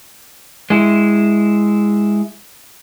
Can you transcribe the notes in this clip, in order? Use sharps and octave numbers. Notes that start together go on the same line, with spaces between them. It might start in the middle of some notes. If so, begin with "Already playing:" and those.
G#3 E4